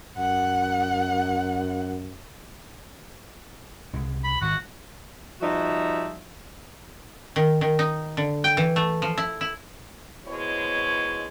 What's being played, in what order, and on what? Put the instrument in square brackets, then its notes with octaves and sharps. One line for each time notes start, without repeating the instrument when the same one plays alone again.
[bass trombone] F#2 [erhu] F#5
[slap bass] C2 G#3
[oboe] B5
[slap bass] G#1 [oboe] F#4
[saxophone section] F3 G3 D#4 F#4 E5
[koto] D#3
D#3
D#4
D3
G5
E3
A3
F3
E4
E4
[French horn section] B2 G#3 E4 C5 C#5